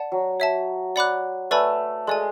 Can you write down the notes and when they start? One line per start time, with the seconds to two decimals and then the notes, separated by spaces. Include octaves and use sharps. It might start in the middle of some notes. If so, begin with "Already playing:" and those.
Already playing: D5 F#5 A5
0.12 F#3
0.40 C#5 E5 A5
0.96 D5 F#5 B5 D6 F#6
1.51 A3 B4 D5 G#5 B5 E6
2.07 G#3 A4 D5 G#5